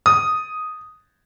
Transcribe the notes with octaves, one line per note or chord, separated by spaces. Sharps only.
D#6